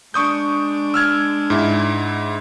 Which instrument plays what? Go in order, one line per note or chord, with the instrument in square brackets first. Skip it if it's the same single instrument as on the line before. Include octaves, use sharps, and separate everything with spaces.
[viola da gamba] G#3 D4 [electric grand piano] C#6 D#6 G6
[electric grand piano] E6 F6 G#6
G#2 E4